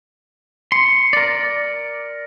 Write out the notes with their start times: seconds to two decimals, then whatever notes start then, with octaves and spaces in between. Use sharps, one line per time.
0.72 C6 C#7
1.13 A#4 D5